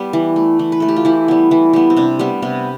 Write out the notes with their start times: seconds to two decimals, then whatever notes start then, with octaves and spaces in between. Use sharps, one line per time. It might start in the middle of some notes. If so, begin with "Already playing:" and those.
Already playing: G3 B3
0.13 E3
0.36 A3
0.59 E3
0.72 B4
0.80 A3 A4
0.88 G4
0.96 F4
1.05 E3 E4
1.28 G3 B3
1.51 E3
1.73 G3 B3
1.90 C4
1.97 C3 D4
2.19 G3 B3
2.42 C3 B3